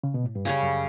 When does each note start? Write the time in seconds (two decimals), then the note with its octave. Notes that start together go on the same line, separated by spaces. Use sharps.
0.03 C#3
0.14 B2
0.24 A2
0.36 G2
0.45 F#2 C#3 G3 C#4
0.62 F#2